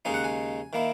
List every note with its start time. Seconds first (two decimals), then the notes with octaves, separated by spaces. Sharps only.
0.05 D#2 C#3 G#3 D#4 G#5
0.14 F#5
0.24 G#5
0.73 D#3 A#3 E4